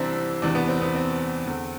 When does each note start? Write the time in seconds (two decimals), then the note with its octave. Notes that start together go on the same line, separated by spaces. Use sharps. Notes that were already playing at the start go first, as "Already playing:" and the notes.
Already playing: C2 C3 E3 C4 D4 E4
0.42 E2 C3 E3 D4
0.55 B3
0.68 C4
0.82 B3
0.95 C4
1.47 E2 D3